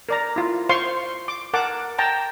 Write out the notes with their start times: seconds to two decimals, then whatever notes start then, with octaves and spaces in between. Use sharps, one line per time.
0.09 A#4 D5 A#5
0.36 E4 F4
0.69 C5 F5 C6 C#6
1.28 D6
1.54 A#4 F#5 A5 D6
1.98 G5 A5 A#5